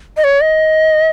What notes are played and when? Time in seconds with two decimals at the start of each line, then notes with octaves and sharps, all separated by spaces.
0.17 D#5
0.24 C#5
0.41 D#5